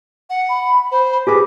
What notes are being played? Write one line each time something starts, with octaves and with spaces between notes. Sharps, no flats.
F#5
B5
C5
G4 G#4 B4 D6